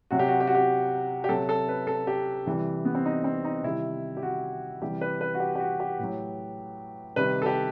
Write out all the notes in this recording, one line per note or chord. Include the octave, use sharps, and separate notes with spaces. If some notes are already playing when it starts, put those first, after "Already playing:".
C3 F#3 F#4
G4
F#4
G4
F#4
G4
G4
C3 F#3 A4
A4
B4
A4
G4
C3 E3 G3
B3
C4
D#4
C4
D#4
C3 D#3 G3 E4
G4
F#4
C3 E3 G3 G4
B4
B4
F#4
G4
G4
F#4
G4
A2
F#3
C3 D#3 G3 B4
A4
G4